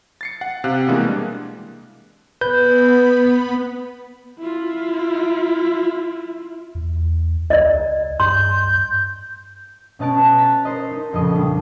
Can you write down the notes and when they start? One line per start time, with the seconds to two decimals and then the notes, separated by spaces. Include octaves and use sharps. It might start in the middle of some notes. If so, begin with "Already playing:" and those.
0.21 A6 C7 C#7
0.41 F#5
0.64 C3 F5 F#6
0.88 B2 E3 G3 G#3 A#3 D4
2.41 B3 B4 B5 G6
4.39 E4 F4
6.75 E2
7.50 C#2 D5 D#5
8.20 G2 C6 G6
9.99 B2 C#4 D#5 A5 F#6 D7
10.38 A#5 A6 B6
10.65 A#4 C5 D#5
10.91 D#4
11.13 A#1 F2 C#3 D#5 D#6
11.34 G3 D4